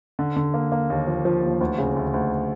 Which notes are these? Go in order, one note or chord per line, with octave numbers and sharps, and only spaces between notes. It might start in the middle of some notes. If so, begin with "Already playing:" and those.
D3
D3
A#3
A#3
D#2
F3
F3
D#2
D2
C#3
D2
D2